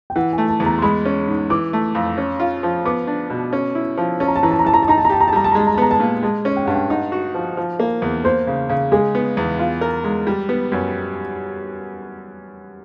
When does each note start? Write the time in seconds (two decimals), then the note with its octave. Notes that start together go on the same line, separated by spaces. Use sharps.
0.10 G5
0.15 E3 F#5
0.33 G#5
0.38 A3
0.48 A5
0.60 E2
0.66 A#5
0.78 C6
0.82 G#3 B5
1.05 C#4
1.28 G#2
1.50 E3 D6
1.73 A3
1.95 F2
2.18 C#4
2.40 F4
2.63 F3
2.85 B3 D6
3.07 D4
3.30 B2
3.53 C#4
3.75 E4
3.97 F3
4.20 C#4 A5
4.28 A#5
4.35 A5
4.43 E3 A#5
4.51 A5
4.59 A#5
4.65 E3 A5
4.74 A#5
4.82 A5
4.88 D#4 A#5
4.98 A5
5.05 A#5
5.09 G4 A5
5.20 A#5
5.28 A5
5.33 G3 A#5
5.44 A5
5.52 A#5
5.55 G#3 A5
5.67 A#5
5.74 A5
5.78 B3 A#5
5.91 A5
6.00 A#2
6.23 G#3 A5
6.45 C#4
6.57 G5
6.65 G2 F#5
6.75 G5
6.90 D#4 F#5
7.12 F#4
7.35 F3
7.57 F3
7.79 A#3
8.02 E2
8.25 A#3 C5
8.47 C#3
8.69 C#3
8.92 G#3 G#4
9.15 B3
9.37 E2
9.59 F4
9.81 A#4
10.04 G#3
10.27 G3 G4
10.49 B3
10.72 F#2